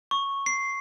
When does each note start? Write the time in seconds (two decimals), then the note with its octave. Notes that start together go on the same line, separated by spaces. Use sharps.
0.11 C#6
0.46 C7